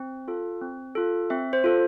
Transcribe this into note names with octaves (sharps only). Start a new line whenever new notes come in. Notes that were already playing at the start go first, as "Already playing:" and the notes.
Already playing: C4
F4 A4
C4
F4 A4
C4 E5
C5
F4 A4